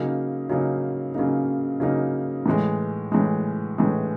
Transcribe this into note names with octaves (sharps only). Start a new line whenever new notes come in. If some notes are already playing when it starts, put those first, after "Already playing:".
Already playing: C#3 F#3 A#3 D#4
C#3 F#3 A#3 D#4
C#3 F#3 A#3 D#4
C#3 F#3 A#3 D#4
A2 E3 G#3
A2 E3 G#3
A2 E3 G#3